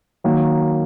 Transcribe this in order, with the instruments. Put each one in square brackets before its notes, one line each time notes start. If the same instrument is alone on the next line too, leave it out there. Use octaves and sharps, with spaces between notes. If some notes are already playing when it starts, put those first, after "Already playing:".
[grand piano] D#3 F#3 A#3